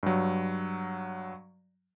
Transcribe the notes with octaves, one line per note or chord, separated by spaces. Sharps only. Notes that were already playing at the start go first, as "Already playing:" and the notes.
G2 F#3